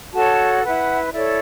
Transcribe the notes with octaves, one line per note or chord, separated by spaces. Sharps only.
F#4 A4 C#5 A5
E4 B4 F#5
E4 A4 C#5 D5